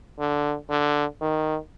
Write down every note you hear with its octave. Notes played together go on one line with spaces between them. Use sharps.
D3
D3
D#3